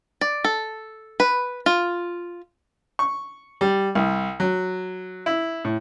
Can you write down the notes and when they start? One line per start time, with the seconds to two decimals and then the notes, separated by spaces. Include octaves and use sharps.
0.21 D5
0.44 A4
1.20 B4
1.66 F4
2.99 C#6
3.61 G3
3.95 C2
4.40 F#3
5.26 E4
5.65 A2